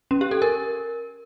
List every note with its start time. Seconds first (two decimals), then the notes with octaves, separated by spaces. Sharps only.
0.11 C#4
0.21 G4
0.31 A4
0.42 A#4